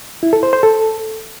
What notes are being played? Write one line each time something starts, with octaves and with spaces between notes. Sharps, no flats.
E4
A4
C5
C5
A4